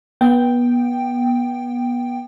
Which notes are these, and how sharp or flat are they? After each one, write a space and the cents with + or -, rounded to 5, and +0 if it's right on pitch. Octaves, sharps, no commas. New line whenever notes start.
B3 -25 G5 +0